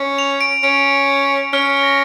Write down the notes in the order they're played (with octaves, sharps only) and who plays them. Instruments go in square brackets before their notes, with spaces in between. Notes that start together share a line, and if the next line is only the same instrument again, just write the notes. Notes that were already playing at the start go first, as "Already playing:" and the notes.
Already playing: [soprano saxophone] C#4
[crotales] F7
D7
[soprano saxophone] C#4 [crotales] D7
[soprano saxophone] C#4 [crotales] F6
[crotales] A#6